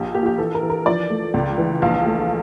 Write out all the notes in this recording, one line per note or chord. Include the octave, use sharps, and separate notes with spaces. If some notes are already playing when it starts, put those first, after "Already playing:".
Already playing: A#1 G4
A#3 G4
F4
G4
E3 A4
A#4
E3
A#4
F3 D5
A3
C#2
E3
A#1 F5
A3